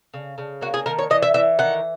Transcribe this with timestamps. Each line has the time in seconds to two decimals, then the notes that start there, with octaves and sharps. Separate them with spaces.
0.14 C#3
0.38 C#3
0.61 A#3 F#4
0.74 G#4
0.86 D#3 A#4
0.99 C#5
1.10 E3 D#5
1.23 E5
1.34 E3 E5
1.59 D#3 F#5